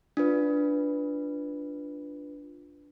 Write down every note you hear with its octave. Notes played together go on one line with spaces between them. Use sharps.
D4 F4 B4